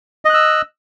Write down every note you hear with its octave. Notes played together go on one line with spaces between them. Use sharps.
D#5 E6 F#6